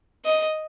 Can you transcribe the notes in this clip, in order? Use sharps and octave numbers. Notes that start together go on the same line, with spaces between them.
D#5